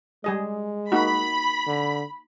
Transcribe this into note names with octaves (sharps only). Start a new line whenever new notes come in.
G3 G#3 G#4 D#5
A#3 D#4 F#4 B5
D3